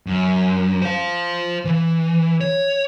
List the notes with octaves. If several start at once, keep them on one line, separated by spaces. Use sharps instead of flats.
F#2
C5 F5
E3
C#5